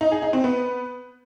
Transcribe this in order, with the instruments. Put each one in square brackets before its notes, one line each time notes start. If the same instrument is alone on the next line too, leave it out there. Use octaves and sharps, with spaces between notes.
[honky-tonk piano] D#4
G#4
D#4
C4
B3